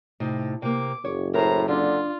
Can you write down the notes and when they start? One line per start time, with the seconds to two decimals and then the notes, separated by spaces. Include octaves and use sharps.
0.20 A2 C3 D#4
0.62 C3 A#3 D6
1.05 F#1 C#5
1.34 A2 A#4 C5 A#5
1.68 D3 D4 F4